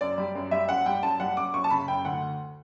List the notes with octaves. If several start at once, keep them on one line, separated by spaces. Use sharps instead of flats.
F#2 D5
G3
F#2
G3 E5
F#2 F#5
G3 G5
F#2 A5
G3 F#5
F#2 D6
F#2 C#6
A5
C#3 B5
F#2 G5
D2 F#5